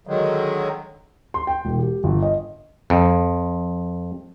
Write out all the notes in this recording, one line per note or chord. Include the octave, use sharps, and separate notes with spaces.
D3 D#3 F#3 G#3
C6
G5
E1
G4
G1
D#5
F2